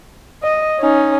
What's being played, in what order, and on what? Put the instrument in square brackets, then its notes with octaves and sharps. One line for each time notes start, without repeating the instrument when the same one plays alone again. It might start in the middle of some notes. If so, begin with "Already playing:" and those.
[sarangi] D#5
[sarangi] C#4 [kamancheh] D#4